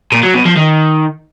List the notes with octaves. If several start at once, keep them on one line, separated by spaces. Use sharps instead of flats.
A#2
F#3
B2
F3
D#3